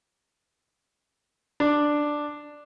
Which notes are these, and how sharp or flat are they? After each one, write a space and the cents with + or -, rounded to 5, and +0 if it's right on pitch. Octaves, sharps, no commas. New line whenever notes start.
D4 +5